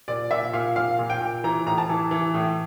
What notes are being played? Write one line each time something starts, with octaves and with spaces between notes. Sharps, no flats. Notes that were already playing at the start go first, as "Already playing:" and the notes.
A#2 D5
A#2 E5
A#2 F5
A#2 F5
A#2
G5
A#2
E3 A#5
A2 A#5
A5
E3
E3
A2